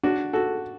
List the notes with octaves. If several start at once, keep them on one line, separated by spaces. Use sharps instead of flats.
D4 F#4
F#4 A4